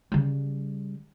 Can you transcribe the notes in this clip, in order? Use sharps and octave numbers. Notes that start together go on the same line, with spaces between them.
C#3 G3